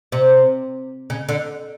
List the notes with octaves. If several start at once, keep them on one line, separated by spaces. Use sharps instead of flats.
C3
C#3
D3